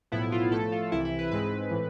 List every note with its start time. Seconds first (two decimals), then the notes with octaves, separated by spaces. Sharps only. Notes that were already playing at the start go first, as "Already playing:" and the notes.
0.12 B1 A2 F3 B3 E4
0.32 F4
0.51 A2 F3 A3 A4
0.72 F4
0.92 C2 C3 E3 E4
1.05 E4
1.19 B4
1.31 G#2 G#3 C4 B4
1.71 A2 E3